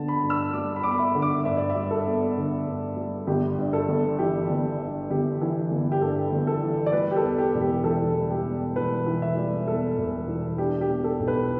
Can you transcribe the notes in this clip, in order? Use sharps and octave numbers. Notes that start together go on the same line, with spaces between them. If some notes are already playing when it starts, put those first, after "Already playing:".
Already playing: D3 B3 A5
B5
G2
E6
G3 D6
B5
B3 D6
B5
E5
D3
D6
G2 E5
D5
E5
G3
A4
B3
D3
G2
G3
G1 G4
G2
A4
G1
E3 G4
G1
G2
G1 G4
E3
G1
G4
G2 A4
G1
A4
E3
D5
G3 B4
G4
A4
E2
G4
E1
G4
E3 A4
G3
G4
E2
E1 B4
E3
E5
G3
E2 A4
E1
E3
D4 G4
G4
B2
A4
B1
B4